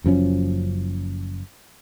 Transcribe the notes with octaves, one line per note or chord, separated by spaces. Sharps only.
F#1 F#2 F3 C#4